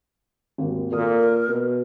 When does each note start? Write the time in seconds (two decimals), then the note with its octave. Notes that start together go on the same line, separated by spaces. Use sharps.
0.58 G#1 D#2
0.91 A#2 A4 A#4 D#6
1.48 B2